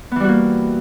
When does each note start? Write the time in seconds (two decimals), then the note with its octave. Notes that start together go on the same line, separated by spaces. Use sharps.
0.11 B3
0.16 E3
0.20 G3
0.24 F#4
0.29 A#3